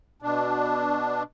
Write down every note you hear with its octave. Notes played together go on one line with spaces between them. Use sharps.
B2 D4